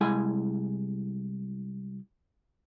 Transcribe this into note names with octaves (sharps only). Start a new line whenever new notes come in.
C2 G#3 E4 G#4 G#5